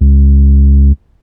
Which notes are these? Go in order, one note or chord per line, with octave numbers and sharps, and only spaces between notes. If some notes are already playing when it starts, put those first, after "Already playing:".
C#2